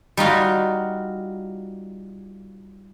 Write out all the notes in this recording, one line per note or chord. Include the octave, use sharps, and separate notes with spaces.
G3 D#4 F4 F#4